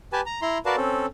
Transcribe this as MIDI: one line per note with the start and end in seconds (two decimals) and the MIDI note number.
0.13 0.21 67
0.13 0.21 71
0.13 0.21 80
0.13 0.21 81
0.26 0.41 82
0.42 0.58 64
0.42 0.58 82
0.42 0.58 84
0.65 0.76 66
0.65 0.76 70
0.65 0.76 71
0.65 0.76 74
0.65 0.76 77
0.65 0.76 81
0.77 1.06 60
0.77 1.06 61
0.77 1.06 69